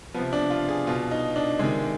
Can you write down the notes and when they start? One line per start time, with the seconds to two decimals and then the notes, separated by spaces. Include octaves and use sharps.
0.14 F3 B3
0.19 C3
0.33 D4
0.50 F4
0.69 G#4
0.87 B2 F4
1.11 D#4
1.36 D4
1.59 C3 D#3 G#3